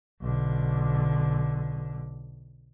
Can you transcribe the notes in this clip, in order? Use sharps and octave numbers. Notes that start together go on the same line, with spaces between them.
B1 D3